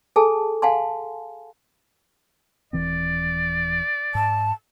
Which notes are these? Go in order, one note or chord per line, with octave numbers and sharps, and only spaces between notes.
G#4 A4 G#5 A5
F5 F#5 G#5 A5 C6
D#1 E3 C4 D5
G#2 A5